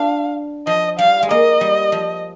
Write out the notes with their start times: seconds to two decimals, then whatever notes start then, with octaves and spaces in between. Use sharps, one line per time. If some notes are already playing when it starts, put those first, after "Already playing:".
Already playing: D4 F4 F5
0.67 F3 D#5
0.99 G3 F5
1.23 G#3
1.30 A#3 D#5
1.61 G3
1.92 F3